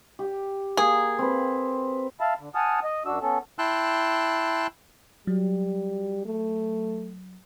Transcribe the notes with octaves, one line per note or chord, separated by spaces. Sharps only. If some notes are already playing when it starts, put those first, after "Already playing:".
G4
A#3 G#4
C4 B4
E5 F5 A5 B5
D3
F#5 G#5 A5 D#6 F6
D#5
F#2 D4 F#4 E6
B3 C#4 A4
E4 G5 A5 C6 E6 F#6
F#3 G3
A3